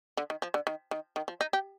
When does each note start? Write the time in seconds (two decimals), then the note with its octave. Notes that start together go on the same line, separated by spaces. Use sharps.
0.17 D3
0.30 D#3
0.42 F3
0.54 D3
0.67 D#3
0.91 D#3
1.16 D#3
1.28 F3
1.41 D#4
1.53 G4